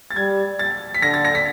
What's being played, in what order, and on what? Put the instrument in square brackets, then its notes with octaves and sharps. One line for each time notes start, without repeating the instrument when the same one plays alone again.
[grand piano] A6
[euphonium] G3 [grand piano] G#6
[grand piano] A6
B6
[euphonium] D3 [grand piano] A#6
[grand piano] A6
A#6
B6